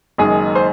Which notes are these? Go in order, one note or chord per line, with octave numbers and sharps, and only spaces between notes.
F#1 F#2 D#3 G#3 G#4
C5